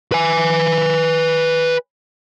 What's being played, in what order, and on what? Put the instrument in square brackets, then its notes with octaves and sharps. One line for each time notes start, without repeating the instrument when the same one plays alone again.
[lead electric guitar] B4 G#5